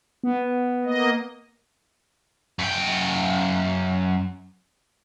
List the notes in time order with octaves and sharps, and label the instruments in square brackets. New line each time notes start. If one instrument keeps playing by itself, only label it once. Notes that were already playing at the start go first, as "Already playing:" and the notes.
[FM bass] B3
[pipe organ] A#3 D#5
[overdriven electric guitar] F#2 G5